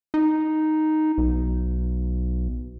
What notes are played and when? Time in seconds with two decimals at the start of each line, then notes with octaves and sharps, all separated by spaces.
0.14 D#4
1.18 B1